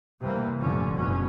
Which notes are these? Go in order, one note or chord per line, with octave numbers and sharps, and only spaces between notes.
C3 E3 G3 A#3
F1 G2 A#2 D3 C#4
F#1 G#2 B2 C#4